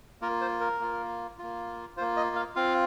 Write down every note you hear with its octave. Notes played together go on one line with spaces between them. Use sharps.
A#3 F4 A#4
C5
A#4
A#3 F4
A#3 F4
A#3 F4 C5
D#5
F5
C4 F4 F5